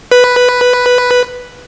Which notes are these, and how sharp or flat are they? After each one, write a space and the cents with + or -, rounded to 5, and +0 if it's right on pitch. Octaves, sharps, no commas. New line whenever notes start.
B4 +0